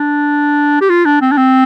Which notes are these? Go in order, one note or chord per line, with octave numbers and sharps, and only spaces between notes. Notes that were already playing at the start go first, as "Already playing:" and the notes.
Already playing: D4
G4
F4
D4
C4
D4
C4